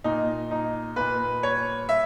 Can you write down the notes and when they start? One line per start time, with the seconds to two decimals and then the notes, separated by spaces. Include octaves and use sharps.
0.04 A#2 D#4
0.51 D#4
0.96 A#2 B4
1.43 C#5
1.89 E5